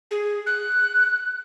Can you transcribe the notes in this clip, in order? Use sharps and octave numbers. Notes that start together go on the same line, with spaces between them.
G#4
F#6